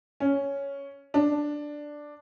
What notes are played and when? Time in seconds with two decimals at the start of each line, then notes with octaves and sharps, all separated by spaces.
0.20 C#4
1.14 D4